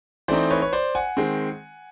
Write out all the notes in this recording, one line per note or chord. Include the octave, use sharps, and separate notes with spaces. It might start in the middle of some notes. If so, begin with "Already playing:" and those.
E3 A3 C4 D#4 C5 D5
B4 C#5
C#5
C5 D5
F#5 G#5
D#3 G#3 C4